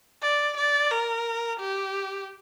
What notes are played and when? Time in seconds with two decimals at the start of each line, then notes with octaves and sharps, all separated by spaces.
0.22 D5
0.57 D5
0.91 A#4
1.60 G4